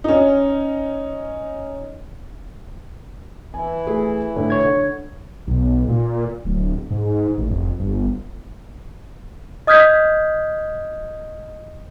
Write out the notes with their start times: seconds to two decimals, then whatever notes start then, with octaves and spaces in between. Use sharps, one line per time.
0.04 C#4 D#4
3.54 E3 E4 G#5
3.87 A3 G#4
4.36 A2 D3
4.50 C#5 G#6
4.65 D3
5.47 B1
5.88 A#2
6.45 D1
6.91 G#2
7.38 A1
7.50 F1
7.80 G1
9.67 D#5 D#6 F6 G6 G#6 B6